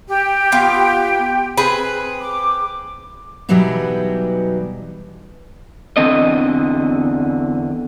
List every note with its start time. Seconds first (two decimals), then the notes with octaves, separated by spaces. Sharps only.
0.08 G4 G5
0.52 B3 F4 F5
1.57 C4 G#4 B4
2.20 D6
3.49 B2 E3 F#3 G3 B3 D#4
5.97 E2 D3 C4 D#5